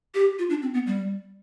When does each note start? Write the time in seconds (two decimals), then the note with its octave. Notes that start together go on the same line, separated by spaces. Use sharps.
0.15 G4
0.39 F4
0.50 D4
0.62 C4
0.74 B3
0.87 G3